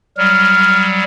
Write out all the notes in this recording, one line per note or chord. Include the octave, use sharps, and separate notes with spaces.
F#3 G3 F6